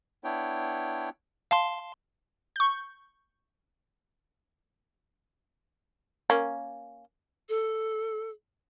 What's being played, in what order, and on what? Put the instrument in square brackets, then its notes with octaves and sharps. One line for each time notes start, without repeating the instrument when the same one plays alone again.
[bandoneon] B3 D4 E4 C#5 G5
[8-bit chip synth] F5 A5 C6
[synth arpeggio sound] C#6 G6
[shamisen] A#3 C#4
[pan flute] A4